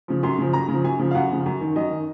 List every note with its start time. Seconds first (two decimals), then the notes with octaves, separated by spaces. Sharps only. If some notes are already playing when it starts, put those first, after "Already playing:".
0.08 C#3 F3
0.23 F#2 C6
0.38 C#3 F3
0.53 F#2 A#5
0.68 C#3 F3
0.84 F#2 G#5
0.99 C#3 F3
1.11 F5
1.15 F#2 F#5
1.30 C#3 F3
1.46 F#2
1.61 D#3
1.76 F#2 D#5
1.91 D#3